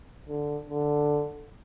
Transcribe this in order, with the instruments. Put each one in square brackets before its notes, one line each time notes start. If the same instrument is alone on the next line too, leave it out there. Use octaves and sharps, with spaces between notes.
[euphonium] D3
D3